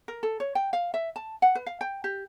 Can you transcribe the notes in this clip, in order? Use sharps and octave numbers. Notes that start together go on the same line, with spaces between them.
A#4
A4
C#5
G5
F5
E5
A5
F#5
B4
F5
G5
G4